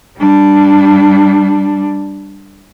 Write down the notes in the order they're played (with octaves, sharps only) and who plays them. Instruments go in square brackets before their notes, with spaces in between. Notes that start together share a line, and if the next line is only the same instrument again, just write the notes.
[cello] G3 D4